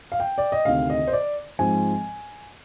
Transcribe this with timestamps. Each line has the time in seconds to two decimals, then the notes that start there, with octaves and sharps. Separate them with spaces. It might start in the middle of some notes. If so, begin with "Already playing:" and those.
0.12 F5
0.20 G5
0.38 D5
0.52 D#5
0.65 D2 C3 D#3 F5
0.90 D#5
1.07 C5
1.13 D5
1.59 G#2 F3 C4 G#5